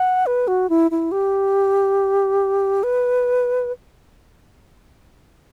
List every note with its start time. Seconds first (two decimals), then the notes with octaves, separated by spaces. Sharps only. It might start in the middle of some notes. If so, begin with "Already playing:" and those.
Already playing: F#5
0.26 B4
0.48 F#4
0.70 E4
0.91 E4
1.12 G4
2.83 B4